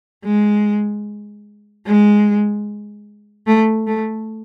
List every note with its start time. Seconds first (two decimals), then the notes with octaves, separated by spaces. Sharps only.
0.24 G#3
1.86 G#3
3.47 A3
3.87 A3